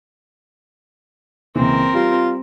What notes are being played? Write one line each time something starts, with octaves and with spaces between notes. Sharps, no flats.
C#2 A#2 E3 C4 A#4
G3 F4